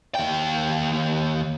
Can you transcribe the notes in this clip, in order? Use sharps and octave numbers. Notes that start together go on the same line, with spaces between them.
D#2 G5